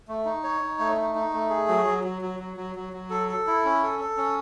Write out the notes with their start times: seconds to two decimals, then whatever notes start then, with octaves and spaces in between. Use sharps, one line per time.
0.08 A3
0.25 D#4
0.44 C#5
0.61 D#4
0.79 A3
0.97 D#4
1.15 D#4
1.33 A3
1.50 G#4
1.68 F#3
1.87 F#3
2.04 F#3
2.21 F#3
2.39 F#3
2.57 F#3
2.75 F#3
2.93 F#3
3.10 A4
3.28 A4
3.47 E4
3.65 C#4
3.83 A4
3.99 A4
4.17 C#4